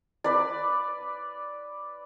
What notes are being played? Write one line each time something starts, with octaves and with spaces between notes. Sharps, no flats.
B4 D5